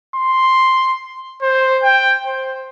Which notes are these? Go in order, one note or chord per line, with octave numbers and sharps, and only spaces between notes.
C6
C5
G5
C5